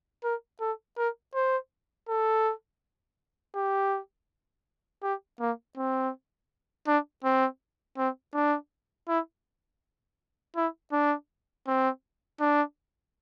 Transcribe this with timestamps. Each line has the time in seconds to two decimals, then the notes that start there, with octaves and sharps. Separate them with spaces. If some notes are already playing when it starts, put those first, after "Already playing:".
0.24 A#4
0.61 A4
0.98 A#4
1.35 C5
2.08 A4
3.55 G4
5.03 G4
5.40 A#3
5.77 C4
6.87 D4
7.24 C4
7.98 C4
8.34 D4
9.08 E4
10.56 E4
10.92 D4
11.67 C4
12.40 D4